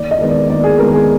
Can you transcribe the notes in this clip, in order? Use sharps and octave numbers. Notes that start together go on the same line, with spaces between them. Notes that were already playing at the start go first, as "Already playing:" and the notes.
Already playing: D#2 D5
D#5
D#3 G#3 B3
D5
D#2 D5
G#4
D#3 G#3 B3 A#4
G#4